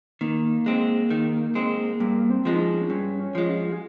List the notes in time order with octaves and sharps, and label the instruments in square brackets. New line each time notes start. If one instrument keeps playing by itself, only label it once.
[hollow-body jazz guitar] D#3 [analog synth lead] A#3
[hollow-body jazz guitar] G#3 C4
D#3
G#3 C4
[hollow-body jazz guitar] G2 [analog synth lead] A#3
[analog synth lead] C4
[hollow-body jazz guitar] F3 G#3
[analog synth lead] D#4
C#4
[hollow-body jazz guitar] G2 [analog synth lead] C#4
[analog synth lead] C#4
[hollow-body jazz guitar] F3 G#3
[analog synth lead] F4
G#4